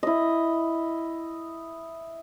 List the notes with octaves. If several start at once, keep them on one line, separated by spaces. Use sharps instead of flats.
E4 D#5